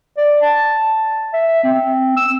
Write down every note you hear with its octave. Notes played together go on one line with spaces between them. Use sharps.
D5
A5
E5
C4
E6